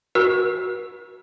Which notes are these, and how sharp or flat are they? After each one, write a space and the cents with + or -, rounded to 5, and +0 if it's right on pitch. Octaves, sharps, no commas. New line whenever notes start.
F#4 +0 A#4 +45 E6 +0